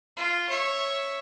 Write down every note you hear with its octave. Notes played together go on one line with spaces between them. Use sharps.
F4
C#5 E5